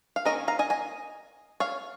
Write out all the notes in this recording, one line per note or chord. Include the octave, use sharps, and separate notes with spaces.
F5
D#3 A#3 C#4 A#4 D#5
F5 A#5
D#5 G#5
D#5 G#5
C#5 F5